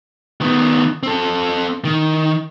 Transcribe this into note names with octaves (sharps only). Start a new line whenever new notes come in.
D#3 B3
C4 A4
D#3